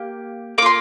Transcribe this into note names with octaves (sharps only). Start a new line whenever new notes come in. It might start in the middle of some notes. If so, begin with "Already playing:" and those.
Already playing: A#3 G4
A#3 F4 C6 D6